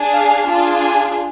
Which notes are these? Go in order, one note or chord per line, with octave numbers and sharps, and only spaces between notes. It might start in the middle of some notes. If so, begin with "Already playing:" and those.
Already playing: D4 G#4
F5
D4 F4 G#4
G#5